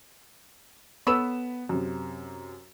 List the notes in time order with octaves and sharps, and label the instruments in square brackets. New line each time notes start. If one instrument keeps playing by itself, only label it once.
[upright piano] B3 B5 E7 [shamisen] A4 B4 C#5
[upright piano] F#2 C3